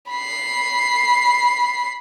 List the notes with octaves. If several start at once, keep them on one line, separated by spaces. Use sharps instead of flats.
B5 C7